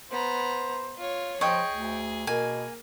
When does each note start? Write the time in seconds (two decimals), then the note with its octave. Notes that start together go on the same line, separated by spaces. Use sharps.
0.11 B3 C5 A#5
0.97 F4 C#5
1.41 F3 G#4 C#5 D#5 G5
1.72 D2
2.27 B2 A#3 G#5